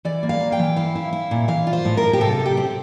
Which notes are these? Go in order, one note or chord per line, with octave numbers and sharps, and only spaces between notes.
E3 D5
A#3
F5
A#3
G5
E3
E4 F5
E4
E4
A#2
E3 F5
F4
C5
A2
A#4
F4
G4
C3 A4
C3
G4
C4